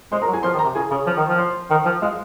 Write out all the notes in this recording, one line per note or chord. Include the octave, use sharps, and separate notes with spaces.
G#3 C5 C6
A#4 A#5
F#3
G#4 G#5
F3 C5 C6
D#3
A#4 A#5
C3
C#3 G#4 G#5
C#3 C#5 C#6
F3
D#3
F3
C5 C6
D#3
F3
G#3 F4 F5